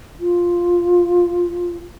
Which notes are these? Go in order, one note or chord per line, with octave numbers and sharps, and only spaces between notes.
F4